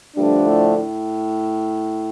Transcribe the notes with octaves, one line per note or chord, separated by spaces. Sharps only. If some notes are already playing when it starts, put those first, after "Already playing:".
G2 D3 F3 A3 D4
A2
A2